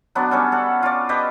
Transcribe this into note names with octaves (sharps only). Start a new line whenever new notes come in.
F#3 B3 D4
G3 C#4 A4
A4 F#5
F4 D5
G4 A4 B4 D#5